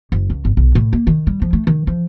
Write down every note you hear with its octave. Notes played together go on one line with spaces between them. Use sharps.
F#1
C#2
G1
B1
A2
A#3
D#3
G3
F3
A3
D#3
F3